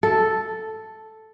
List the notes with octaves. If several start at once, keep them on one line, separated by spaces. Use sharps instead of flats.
A4